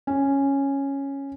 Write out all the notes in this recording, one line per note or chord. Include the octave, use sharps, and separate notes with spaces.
C#4